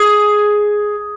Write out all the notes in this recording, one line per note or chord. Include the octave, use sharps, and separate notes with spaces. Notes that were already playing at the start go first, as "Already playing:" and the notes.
Already playing: G#4